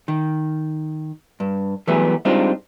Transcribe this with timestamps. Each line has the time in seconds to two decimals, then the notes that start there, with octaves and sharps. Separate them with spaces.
0.08 D#3
1.40 G2
1.87 E3 F#3 G3 A3 B3 G#4
2.25 G3 G#3 C4 D4 D#4 F4